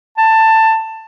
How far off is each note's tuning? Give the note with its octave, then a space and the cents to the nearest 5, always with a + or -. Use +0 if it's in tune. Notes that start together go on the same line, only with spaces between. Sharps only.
A5 +15